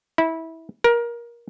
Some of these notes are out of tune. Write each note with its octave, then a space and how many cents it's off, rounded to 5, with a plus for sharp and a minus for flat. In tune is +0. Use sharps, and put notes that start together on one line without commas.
E4 -20
A#4 +20